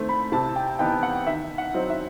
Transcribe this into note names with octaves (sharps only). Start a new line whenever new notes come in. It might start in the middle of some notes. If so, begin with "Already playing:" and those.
Already playing: D#3 A3 C4
B5
C3 A5
G5
E3 B3 D#4 G5
F#5
D#3 E5
F#5
F#3 C4 D#4
E5